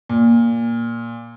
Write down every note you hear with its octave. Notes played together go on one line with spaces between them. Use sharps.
A#2